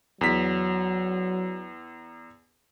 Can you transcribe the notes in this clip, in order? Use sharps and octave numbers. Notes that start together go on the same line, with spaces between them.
E2 F#3 B6